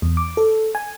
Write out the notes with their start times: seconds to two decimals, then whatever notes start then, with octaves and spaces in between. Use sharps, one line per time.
0.02 E2
0.17 D6
0.37 A4
0.75 G#5